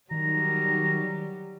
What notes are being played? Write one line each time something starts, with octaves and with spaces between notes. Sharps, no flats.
D#3 F#3 G3 A#5